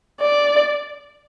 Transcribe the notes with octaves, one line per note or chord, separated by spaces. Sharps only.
D5